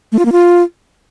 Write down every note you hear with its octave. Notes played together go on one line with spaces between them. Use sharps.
A3
F4
A#3
F4